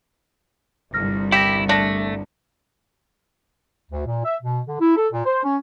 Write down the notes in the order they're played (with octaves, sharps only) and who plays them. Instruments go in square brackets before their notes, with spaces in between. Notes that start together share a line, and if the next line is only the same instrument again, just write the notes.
[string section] G1 C2 [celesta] F6 A#6
[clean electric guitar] E4 [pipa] G4 [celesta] A#6 B6
[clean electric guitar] A3 [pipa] D4 [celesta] A#6 F#7
[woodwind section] D2
A#2
E5
B2
D3
E4
A4
A#2
C5
C#4